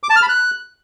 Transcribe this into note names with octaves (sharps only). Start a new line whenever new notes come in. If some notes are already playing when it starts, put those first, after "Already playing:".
D6
A5
F6
B5
F#6